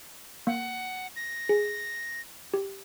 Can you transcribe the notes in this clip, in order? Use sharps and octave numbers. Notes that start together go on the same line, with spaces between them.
A#3 F#5
A#6
G#4
G4